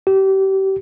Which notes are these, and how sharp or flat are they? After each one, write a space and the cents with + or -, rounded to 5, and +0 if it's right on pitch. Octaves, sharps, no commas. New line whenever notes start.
G4 -30